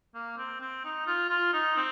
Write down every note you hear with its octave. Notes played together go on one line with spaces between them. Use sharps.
A#3
C4
C4
D#4
F4
F4
D#4
C4